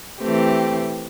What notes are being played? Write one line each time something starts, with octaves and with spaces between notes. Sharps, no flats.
E3 A3 C4 G4